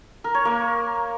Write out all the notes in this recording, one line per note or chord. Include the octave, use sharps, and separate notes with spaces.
A#4
C#5
A#3 A#4